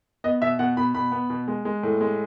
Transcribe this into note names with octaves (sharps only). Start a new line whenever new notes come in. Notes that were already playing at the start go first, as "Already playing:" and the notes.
B3 D#5
B2 E5
B2 F#5
B2 B5
B2 B5
B3
B2
G#3
G#3
A2
G#3